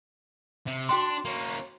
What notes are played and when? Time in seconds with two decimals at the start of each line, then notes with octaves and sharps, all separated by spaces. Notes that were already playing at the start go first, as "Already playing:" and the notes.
0.67 C3
0.89 D4 F#4 G5 C6
1.25 A#3 C#4